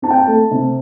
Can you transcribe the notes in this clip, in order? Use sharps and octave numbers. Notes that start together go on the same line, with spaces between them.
C4 A5
G5
A5
A3
C3